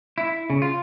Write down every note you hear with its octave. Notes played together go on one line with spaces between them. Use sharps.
E4
C#3
F4